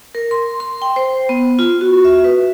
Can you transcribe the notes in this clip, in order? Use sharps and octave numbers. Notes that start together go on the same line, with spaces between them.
A#4
C6
C6
G5
C5
B3
F4
F#4
E5
B4